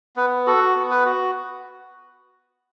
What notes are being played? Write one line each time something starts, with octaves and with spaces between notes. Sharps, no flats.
B3 B4
F#4 A4
B3
B4
F#4